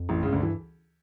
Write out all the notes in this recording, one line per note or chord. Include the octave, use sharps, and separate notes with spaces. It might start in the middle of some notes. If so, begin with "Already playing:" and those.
Already playing: F2
A1 A2
C#2 G2 C#3
D2 D3
E3